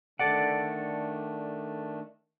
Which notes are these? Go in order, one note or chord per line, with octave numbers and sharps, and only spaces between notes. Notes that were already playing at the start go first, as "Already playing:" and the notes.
D#3 A3 D4 A4 D5 F#5